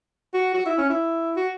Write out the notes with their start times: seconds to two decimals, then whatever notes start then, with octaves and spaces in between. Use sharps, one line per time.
0.34 F#4
0.54 F#4
0.66 E4
0.78 C#4
0.90 E4
1.36 F#4